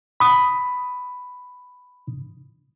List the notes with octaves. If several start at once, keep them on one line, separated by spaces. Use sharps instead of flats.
B5 D#6